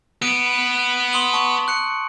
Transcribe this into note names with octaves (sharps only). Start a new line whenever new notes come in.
B3 D7 D#7
C6 D#6 F#7
A5 C#6
F#6 C#7